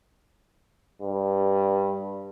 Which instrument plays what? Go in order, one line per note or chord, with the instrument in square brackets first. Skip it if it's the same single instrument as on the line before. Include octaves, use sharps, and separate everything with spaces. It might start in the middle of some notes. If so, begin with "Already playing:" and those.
[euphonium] G2